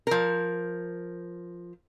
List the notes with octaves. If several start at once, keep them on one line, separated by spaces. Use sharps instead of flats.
F3 A#4